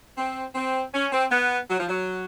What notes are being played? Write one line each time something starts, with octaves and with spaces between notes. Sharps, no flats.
C4
C4
C#4
C4
B3
F#3
F3
F#3